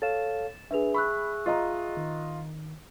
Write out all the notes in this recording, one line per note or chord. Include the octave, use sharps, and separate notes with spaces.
A4 C#5 F5 A6 E7
D4 G#4 B4 E5 F7
B5 C#6 E6 F#6
F4 D#5 A#5
D#3